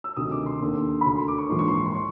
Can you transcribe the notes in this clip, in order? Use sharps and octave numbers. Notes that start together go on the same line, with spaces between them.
E6
D2 C3 D#3 D#6
D6
C6
D#2 D3
B5
D2 D3 C6
C6
D6
C#6
A#1 G#2 E3 C6
C#6
C6
C#6
C6
C#6